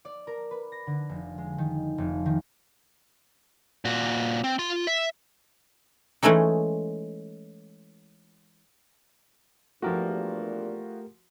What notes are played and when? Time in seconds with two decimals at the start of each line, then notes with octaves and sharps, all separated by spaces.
0.05 D5
0.27 A#4
0.51 B4
0.72 A#6
0.87 D3
1.09 F1
1.38 G#3
1.58 D#3
1.98 F1
2.26 D#3
3.85 A#2 F#4
4.44 C4
4.59 F4 C6
4.87 E5
6.23 E3 G#3 A3 C#4 D#4
9.82 E2 G2 A#2 F3 A3 F#4 G4 A#4